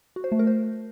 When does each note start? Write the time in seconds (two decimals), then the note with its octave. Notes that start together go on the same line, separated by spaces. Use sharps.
0.16 F#4
0.24 C5
0.32 A3
0.39 A#4
0.47 C5